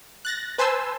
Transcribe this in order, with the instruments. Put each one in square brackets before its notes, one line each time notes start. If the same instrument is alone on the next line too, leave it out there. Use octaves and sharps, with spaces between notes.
[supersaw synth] F#6 A6 A#6
B4 C5 G#5 A5 C6 E6